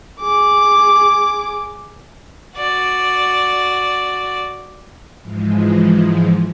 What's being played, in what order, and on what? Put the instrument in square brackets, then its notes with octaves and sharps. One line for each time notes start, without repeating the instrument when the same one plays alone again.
[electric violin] G#4 D6
[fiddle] F#4 D5
[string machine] G#2 E3 F3 G#3